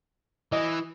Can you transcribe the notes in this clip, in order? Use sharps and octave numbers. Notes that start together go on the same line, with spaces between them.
E3 D#5